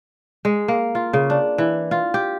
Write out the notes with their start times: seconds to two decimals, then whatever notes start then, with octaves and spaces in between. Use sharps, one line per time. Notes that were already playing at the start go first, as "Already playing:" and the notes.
0.45 G#3
0.68 A#3
0.95 F4
1.13 C#3
1.30 D4
1.58 E3
1.91 F4
2.14 G4